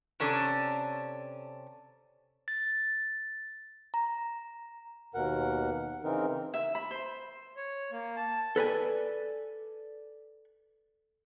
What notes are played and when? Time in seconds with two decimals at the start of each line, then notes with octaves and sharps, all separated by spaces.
0.20 C3 C#4 D4 A4
2.48 A6
3.94 A#5
5.14 D#2 B2 A#4 F#5
6.04 C#3 E3 C4 D#4 A#4
6.54 E5
6.75 B5
6.91 C5
7.57 C#5
7.92 A#3
8.17 A5
8.56 A4 B4 D5 G#5